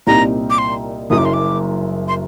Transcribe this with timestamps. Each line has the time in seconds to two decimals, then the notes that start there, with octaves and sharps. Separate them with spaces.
0.07 C2 A#2 G3 C4 D#4 A#5
0.50 D6
0.58 C6
1.10 F#1 F#2 F#3 D#6
1.18 D6
1.25 C6
1.33 D6
2.08 C6